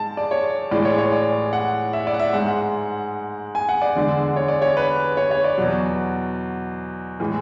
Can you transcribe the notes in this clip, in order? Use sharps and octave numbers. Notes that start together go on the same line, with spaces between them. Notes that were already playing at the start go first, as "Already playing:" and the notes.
Already playing: G#2 G#3 A5
D5
C#5
A2 E3 G#3 D5
C#5
C#5
D5
F#5
E5
D5
F#5
E5
G#2 G#3 F#5
G#5
F#5
D5
E2 D3 G#3
C#5
D5
C#5
B4
C#5
C#5
D5
E2 B2 F#3
A2 E3 G#3